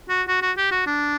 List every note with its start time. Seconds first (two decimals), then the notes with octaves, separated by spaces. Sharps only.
0.09 F#4
0.28 F#4
0.42 F#4
0.57 G4
0.71 F#4
0.86 D4